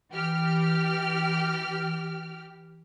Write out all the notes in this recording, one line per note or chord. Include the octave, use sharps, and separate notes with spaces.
E3 G4 F6